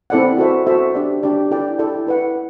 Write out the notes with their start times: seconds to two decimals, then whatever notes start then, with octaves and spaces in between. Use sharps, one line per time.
0.10 C4 E4 A4 D5 F#5
0.38 F#4 A4 C5 E5
0.67 F#4 A4 C5 E5
0.95 D4 G4 D5
1.23 D4 G4 D5
1.51 E4 A4 D5 G5
1.79 E4 A4 D5 G5
2.07 E4 B4 F#5